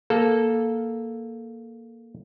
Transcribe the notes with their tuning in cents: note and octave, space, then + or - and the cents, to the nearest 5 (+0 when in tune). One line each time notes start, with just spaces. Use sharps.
A#3 +0 A4 -5